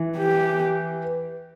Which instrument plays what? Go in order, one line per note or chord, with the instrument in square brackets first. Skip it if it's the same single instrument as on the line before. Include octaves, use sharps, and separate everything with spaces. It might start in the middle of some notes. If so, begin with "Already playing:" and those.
Already playing: [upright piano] E3
[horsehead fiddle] G4